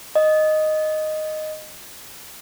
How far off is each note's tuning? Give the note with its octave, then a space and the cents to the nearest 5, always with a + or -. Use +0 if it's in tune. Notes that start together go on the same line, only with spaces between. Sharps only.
D#5 -5